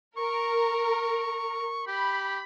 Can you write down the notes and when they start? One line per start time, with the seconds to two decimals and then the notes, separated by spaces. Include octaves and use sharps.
0.17 A#4 C#6
1.87 G4 B5